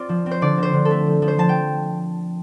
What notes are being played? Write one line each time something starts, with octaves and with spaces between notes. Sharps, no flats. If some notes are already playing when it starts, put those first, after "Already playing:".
Already playing: C4 F4 D5
F3
C4
C5
D3 D5
C4
C5
D3
A4
A3
F3
F3
C5
F3 A5
G5